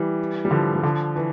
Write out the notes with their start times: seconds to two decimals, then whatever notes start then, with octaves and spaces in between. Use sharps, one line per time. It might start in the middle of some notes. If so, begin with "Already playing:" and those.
Already playing: E3 G3
0.45 G3
0.51 D3 F3
0.75 G3
0.83 D3 F3
1.16 E3